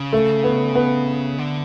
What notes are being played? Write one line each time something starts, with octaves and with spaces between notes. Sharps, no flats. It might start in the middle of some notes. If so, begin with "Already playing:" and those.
Already playing: C#3
A3
B3
B3
D3